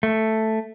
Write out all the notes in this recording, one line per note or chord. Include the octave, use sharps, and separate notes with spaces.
A3